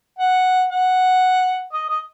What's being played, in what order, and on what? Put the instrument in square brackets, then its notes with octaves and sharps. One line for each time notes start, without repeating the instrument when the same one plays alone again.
[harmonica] F#5
F#5
D#5
D#5